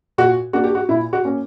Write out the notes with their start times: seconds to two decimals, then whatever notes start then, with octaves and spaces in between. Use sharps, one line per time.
0.18 A#2 F#4
0.53 A#3 D4 F#4
0.64 G4
0.75 F#4
0.89 A#2 E4
1.13 F#4
1.25 A#3 C#4